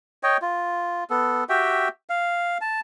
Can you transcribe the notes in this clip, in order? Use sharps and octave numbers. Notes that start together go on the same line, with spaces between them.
C#5 D#5 G5
F4
B3 A4
F#4 G4 E5 G5
F5
A5